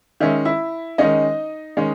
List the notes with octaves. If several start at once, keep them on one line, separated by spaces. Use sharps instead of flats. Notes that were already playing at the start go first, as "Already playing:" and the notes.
D#3 G#3 C#4 E5
E4 E5
D#3 G#3 C#4 D#4 D#5
D#3 G#3 C#4